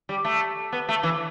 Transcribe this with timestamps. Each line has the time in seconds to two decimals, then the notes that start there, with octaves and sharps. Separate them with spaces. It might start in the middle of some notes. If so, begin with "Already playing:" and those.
0.09 G3
0.25 A3
0.72 B3
0.89 A3
1.03 E3